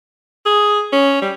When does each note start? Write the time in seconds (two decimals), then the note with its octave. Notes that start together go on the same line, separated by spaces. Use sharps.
0.46 G#4
0.92 C#4
1.22 G3